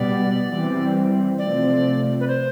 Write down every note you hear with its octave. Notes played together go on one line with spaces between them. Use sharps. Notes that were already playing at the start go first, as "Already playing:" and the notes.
Already playing: B2 G3 B3 D5
E3 G3 C4
C3 F3 A3 C4 D5
B4
C5